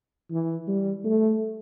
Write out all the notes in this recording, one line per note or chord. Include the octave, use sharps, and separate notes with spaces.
E3
G3
A3